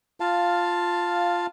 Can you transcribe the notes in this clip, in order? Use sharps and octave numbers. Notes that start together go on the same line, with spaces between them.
F4 F5 A5